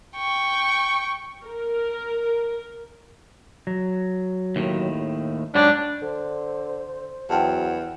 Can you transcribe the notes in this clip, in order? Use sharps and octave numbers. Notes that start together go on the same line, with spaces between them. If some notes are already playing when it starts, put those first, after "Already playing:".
G5 C#6
A#4
F#3
D#2 A2 D#3
G#2 F#3 G3 D4 C#5
D3 C5
E2 F#3 F#5 G5 A5